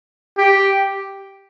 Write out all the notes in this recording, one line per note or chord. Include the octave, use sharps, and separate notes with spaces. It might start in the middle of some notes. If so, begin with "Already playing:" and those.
G4